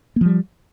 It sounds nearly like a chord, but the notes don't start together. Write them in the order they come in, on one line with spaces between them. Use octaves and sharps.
A#3 F3 G3